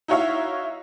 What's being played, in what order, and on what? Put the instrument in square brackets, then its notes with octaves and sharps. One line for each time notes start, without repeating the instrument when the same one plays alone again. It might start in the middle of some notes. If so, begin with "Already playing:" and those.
[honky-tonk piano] D#4 E4 F#4 C#5 E5 F5